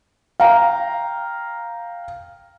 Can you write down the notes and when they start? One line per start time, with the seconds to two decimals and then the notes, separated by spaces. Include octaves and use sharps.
0.40 F5 G5 A#5